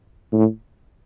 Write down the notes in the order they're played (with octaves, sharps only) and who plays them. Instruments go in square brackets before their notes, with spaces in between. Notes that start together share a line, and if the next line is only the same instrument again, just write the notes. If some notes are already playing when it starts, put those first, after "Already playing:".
[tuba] A2